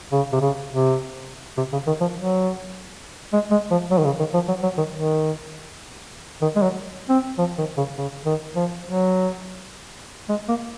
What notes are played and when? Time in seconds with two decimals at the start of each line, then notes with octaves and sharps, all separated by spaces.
0.12 C#3
0.32 C3
0.41 C#3
0.70 C3
1.57 C3
1.73 C#3
1.87 D#3
2.01 F3
2.16 F#3
3.33 G#3
3.51 G#3
3.71 F3
3.90 F#3
3.99 D#3
4.05 C#3
4.19 D#3
4.34 F3
4.48 F#3
4.63 F#3
4.78 D#3
4.92 D#3
6.42 D#3
6.56 G#3
6.62 F#3
7.09 C4
7.38 F3
7.58 D#3
7.77 C#3
7.98 C#3
8.26 D#3
8.56 F3
8.85 F#3
10.29 G#3
10.48 A#3